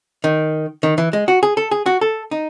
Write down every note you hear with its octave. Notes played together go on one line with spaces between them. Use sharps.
D#3
D#3
E3
G#3
F#4
G#4
A4
G#4
F#4
A4
D#4